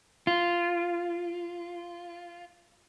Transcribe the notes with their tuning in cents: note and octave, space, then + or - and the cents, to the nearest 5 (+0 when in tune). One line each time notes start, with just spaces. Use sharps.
F4 -10